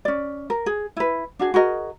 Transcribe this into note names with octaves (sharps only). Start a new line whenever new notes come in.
C#4 D5
A#4
G#4
E4 B4
D4 F#4 G#4
F#4 G#4 A#4 D#5